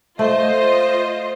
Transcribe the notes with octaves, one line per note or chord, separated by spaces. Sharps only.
A3 F4 C5 D#5